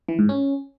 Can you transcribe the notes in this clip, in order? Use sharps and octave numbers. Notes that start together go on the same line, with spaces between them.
E3
G#2
C#4